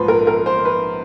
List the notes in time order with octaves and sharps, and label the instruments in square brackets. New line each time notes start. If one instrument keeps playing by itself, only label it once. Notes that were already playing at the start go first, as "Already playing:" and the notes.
Already playing: [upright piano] A#1 G#2 F3 B4 C5
A#4
A#4
C5
B4